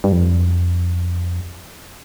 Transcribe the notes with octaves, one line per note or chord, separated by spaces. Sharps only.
G2
F2